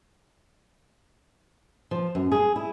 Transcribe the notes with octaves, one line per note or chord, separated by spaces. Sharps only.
F3
F#2
G#4
E4